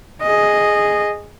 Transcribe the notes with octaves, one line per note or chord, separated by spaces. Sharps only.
G#4 D#5